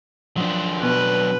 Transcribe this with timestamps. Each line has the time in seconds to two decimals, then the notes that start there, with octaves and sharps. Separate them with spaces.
0.37 F3 F#3 D4
0.82 B2 B4